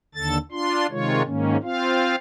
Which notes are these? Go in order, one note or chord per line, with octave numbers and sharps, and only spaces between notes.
D#2 D3 A4 A6
D4 F4 C6
C3 D#3 G#3 F4 C#5
G#2 D#3 A#3 C#4
C4 F4 F5